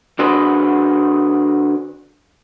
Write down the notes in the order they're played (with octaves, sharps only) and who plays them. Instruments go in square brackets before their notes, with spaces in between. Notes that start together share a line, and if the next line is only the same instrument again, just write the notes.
[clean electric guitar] D3 D4 F#4 G#4 B4 C5